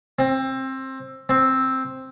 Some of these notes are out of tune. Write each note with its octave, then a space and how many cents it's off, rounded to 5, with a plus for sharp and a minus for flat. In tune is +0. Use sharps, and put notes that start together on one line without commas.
C4 +20
C4 +5